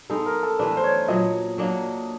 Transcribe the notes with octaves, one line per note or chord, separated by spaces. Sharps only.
G#3 B3 D#4 A4
A#4
A4
E3 A3 D4 B4
C5
C#5
A#2 F#3 B3 D#5
F#3 A#3 D4